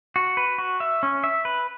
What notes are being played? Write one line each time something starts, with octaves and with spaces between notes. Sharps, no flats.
F#4
B4
F#4
E5
C#4
E5
B4